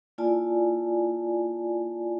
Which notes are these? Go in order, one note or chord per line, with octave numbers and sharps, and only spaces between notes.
A#3 E4 F4 D5 G#5 A5